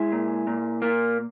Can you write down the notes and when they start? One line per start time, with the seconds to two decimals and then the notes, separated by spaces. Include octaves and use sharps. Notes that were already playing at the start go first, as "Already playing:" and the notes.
Already playing: G#3 E4 G#4
0.12 A#2
0.47 A#2
0.82 A#3